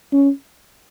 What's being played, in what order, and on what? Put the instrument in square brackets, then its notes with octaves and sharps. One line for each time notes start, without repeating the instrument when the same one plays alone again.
[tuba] C#4